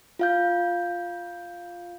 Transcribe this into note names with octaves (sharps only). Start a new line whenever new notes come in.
F4 F5 G6